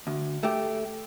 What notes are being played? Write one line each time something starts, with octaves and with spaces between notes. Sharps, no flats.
D2
A3 G4